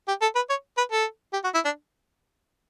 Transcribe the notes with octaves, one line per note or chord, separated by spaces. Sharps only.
G4
A4
B4
C#5
B4
A4
G4
F#4
E4
D4